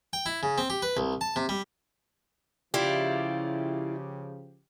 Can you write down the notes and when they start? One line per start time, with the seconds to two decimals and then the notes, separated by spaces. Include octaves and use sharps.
0.13 G5
0.26 E4
0.43 C#3
0.58 C4
0.70 G4
0.82 B4
0.97 C2
1.21 A5
1.36 C3
1.49 G3
2.74 C#3 F3 E4 F4 G4 D5